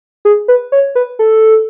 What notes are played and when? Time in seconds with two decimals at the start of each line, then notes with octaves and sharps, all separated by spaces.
0.25 G#4
0.48 B4
0.72 C#5
0.95 B4
1.19 A4